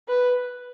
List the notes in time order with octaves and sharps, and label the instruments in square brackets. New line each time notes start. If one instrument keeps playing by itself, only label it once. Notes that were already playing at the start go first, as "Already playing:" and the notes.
[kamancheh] B4